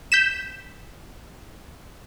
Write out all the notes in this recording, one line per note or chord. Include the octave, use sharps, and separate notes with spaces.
G6 B6 E7